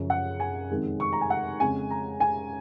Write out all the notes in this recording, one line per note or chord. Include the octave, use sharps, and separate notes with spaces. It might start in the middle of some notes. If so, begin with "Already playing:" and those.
Already playing: F#2 C#3 F3
F#5
G#5
F2 C3 D#3 G#3
C#6
A#5
G#5
F#5
F2 C#3 G#3 G#5
A#5
G#5